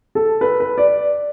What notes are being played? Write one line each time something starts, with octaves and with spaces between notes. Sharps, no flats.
A4
B4
B4
D5